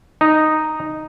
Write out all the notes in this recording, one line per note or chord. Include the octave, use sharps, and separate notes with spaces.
D#4